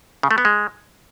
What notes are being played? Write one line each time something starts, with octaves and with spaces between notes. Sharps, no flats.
C#3
A3
B3
G#3